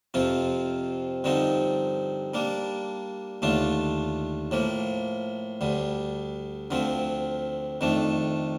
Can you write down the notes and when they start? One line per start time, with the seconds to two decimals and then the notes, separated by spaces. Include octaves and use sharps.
0.14 F2 C3 F3 C4 F4
1.24 G2 D3 F3 C4 D#4
2.34 G3 A#3 D4
3.42 D#2 D3 A3 D4 F4
4.51 A2 F3 A#3
5.61 D2 D3 G3
6.71 D2 D3 F3 C4
7.81 F2 D#3 A3 D4